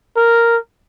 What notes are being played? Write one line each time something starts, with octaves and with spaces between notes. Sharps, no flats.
A#4